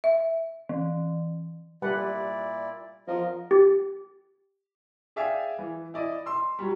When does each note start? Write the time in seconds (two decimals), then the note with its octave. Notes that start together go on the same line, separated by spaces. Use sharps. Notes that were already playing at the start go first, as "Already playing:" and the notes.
0.04 E5
0.69 E3
1.82 A#2 G3 E4 B4 D5 F#5
3.08 E2 F3 A#4 D#5
3.51 G4
5.16 G#4 D5 E5 F5 G5 G#5
5.58 E3
5.94 E4 D5 D#5
6.26 C6 E6
6.59 F#3 G3